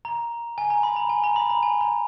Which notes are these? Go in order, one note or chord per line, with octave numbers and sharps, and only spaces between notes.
A#5
G#5
A#5
B5
A#5
G#5
A#5
B5
A#5
G#5
A#5